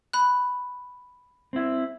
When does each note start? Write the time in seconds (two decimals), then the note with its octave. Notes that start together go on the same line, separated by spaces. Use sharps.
0.13 B5 F#6
1.53 C4 E4